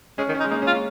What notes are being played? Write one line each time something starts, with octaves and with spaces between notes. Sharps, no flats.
G#3 C#4
D#3
C#4
D#4
G#3
A#3 D#4
C#4
F4
C#4